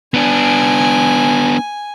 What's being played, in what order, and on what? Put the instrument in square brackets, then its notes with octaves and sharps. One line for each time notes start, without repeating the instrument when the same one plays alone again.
[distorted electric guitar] B3 D4 [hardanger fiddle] G#5